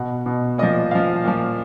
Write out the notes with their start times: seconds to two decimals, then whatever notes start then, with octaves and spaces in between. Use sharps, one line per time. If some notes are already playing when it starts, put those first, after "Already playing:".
Already playing: B2 F#5
0.26 B2
0.58 A#2 F3 D#5
0.91 A#2 F3 F5
1.24 A#2 F3